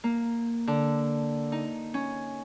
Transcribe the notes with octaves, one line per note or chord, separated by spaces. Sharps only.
A#3
D3
D#4
C#4